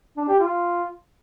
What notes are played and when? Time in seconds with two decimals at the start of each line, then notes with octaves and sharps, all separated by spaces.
0.17 D4
0.28 G4
0.40 F4